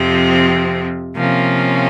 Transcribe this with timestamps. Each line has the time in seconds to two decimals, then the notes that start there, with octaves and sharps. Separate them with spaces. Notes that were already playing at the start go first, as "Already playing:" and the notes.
Already playing: F2 C3 F3 C4
1.16 C3 F3 A#3 C#4